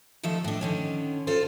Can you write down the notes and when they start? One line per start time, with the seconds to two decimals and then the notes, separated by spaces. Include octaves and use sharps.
0.23 D#3 F3 A3 E5
0.44 A2 D4
0.61 D3 D#3 C#4
1.27 F4 A4 C5